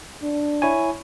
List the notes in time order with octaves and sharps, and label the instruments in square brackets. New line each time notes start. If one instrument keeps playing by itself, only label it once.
[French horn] D4
[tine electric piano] E4 C#5 G#5